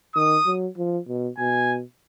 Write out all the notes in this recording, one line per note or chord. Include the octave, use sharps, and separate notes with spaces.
D#3 D#6
F#3
F3
B2
B2 G#5